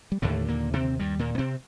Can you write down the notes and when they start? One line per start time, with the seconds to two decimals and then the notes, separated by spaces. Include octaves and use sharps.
0.12 G3
0.22 D#2 A2 D3 A3
0.48 A#2 A#3
0.73 C3 C4
0.99 G2 G3
1.19 A#2 A#3
1.35 A#3
1.38 C3 C4